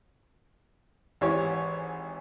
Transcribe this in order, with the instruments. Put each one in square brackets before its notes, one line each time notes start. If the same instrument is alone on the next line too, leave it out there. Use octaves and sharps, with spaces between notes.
[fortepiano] G#1 E3 G4 C#5